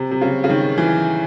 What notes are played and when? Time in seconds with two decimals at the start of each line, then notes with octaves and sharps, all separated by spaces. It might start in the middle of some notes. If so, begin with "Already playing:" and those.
Already playing: C3
0.11 C3
0.21 C#3
0.44 C#3
0.50 D#3
0.78 E3